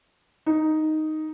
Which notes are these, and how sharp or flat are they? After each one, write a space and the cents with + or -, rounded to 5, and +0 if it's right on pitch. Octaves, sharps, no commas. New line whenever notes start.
D#4 +0